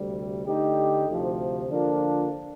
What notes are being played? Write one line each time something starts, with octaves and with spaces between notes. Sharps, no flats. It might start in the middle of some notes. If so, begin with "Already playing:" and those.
Already playing: D2 C3 G3
D3 A3 D#4 G4
D2 C3 F3
D3 F3 A#3 D4 F4